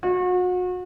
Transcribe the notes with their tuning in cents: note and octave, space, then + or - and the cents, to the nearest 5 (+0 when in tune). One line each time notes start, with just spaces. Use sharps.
F#4 -35